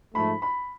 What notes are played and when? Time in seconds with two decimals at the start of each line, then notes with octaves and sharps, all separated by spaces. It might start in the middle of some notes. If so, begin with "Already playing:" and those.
0.15 G#2 F3 A3 B5
0.42 B5